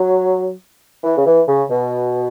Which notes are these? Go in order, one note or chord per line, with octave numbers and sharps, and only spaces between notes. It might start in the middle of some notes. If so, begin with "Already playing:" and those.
Already playing: F#3
E3
C#3
E3
C#3
B2